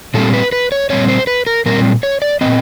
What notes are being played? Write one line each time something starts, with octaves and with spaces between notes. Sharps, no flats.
A#2 G3 C4 A4
B4
B4
C#5
A#2 G3 C4 C#5
C5
B4
A#4
A#2 G3 C4 A#4
C#5
D5
A#2 G3 C4 D#5